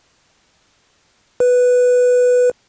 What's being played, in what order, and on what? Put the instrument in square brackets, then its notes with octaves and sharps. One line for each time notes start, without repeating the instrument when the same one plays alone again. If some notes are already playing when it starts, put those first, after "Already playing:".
[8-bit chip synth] B4